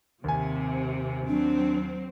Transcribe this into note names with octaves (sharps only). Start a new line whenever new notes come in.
D#2 C3 G#5
F#3 C4 D4